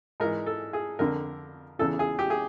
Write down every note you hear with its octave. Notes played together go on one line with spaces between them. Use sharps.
G#2 E3 A#4
A4
G#4
F2 D3 A#4
E2 C#3 E3 A4
G#4
G4
G#4